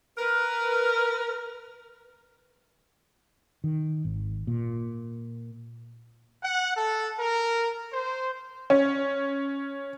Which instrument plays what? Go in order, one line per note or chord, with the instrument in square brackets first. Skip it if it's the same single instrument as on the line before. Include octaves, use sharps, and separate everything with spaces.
[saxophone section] A#4 B4
[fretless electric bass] D#3
G#1
A#2
[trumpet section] F#5
A4
A#4
C5
[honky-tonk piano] C#4